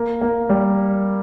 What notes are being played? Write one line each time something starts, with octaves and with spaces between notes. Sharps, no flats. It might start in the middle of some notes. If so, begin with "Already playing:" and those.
Already playing: A#3
A#3
G3